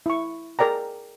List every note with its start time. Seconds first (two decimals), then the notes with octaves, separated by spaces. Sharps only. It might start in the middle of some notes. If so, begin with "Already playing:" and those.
0.06 E4 C#6
0.59 G#4 A#4 D5 G5 A#5